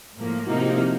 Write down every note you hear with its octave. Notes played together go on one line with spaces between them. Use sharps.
A2 F3 A#3
C3 F3 A#3 D#4 E4 F#4
F4 G4
E4 F#4